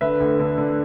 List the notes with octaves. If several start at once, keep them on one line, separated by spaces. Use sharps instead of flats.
D3 B4 E5
D2
D3
D3